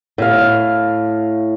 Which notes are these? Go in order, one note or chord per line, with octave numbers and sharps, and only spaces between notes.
A2 F5